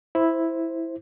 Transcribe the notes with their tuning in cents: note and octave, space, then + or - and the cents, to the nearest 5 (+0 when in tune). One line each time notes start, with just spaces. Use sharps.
E4 +0 C5 +0